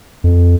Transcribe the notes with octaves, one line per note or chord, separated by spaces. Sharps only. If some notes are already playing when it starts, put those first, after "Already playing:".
F2